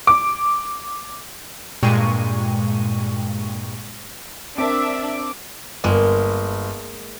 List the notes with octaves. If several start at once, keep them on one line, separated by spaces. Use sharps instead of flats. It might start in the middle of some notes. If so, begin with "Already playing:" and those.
D6
G2 A#2 G#3 G5 C#6 D#7
C4 D4 A#4 E5 D6
G1 G#3 A#3